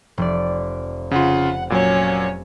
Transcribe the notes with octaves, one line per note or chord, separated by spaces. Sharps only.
F1 D5
C#3 F4 F#5
A#2 F#3 C#4 C#5